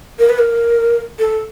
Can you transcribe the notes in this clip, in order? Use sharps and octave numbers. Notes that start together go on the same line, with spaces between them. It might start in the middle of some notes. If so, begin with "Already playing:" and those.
A#4
B4
A#4
A4